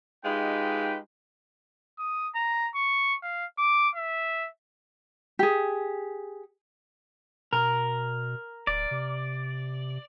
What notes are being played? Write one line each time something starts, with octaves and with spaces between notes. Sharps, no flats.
G#3 D#4 F4 G4 B4 G5
D#6
A#5
C#6
F5
D6
E5
G4 G#4
B2 A#4
D1 D5
C3